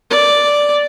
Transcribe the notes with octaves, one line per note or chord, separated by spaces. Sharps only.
D5